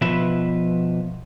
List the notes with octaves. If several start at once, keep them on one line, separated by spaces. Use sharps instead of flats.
B2 F3 B4 E5